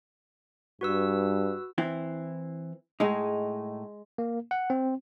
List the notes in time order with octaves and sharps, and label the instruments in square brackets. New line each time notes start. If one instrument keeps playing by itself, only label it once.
[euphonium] G2 [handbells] F#4 B4 E6
[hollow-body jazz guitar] E3 C4 E4
[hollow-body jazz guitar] A2 D#4 [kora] G#3
[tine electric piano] A#3
F#5
C4